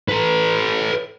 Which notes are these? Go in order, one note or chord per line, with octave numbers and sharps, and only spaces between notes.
A4 B4